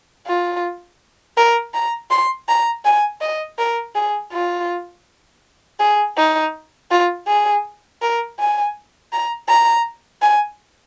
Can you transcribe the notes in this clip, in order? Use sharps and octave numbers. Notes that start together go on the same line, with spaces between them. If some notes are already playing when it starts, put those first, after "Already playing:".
F4
A#4
A#5
C6
A#5
G#5
D#5
A#4
G#4
F4
G#4
D#4
F4
G#4
A#4
G#5
A#5
A#5
G#5